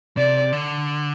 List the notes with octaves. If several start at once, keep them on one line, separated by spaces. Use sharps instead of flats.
C3 D5
D3